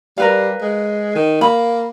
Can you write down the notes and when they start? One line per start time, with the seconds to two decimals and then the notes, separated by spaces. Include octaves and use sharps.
0.18 G3 A#4 B4 F5
0.61 G#3
1.15 D#3
1.41 A#3 B5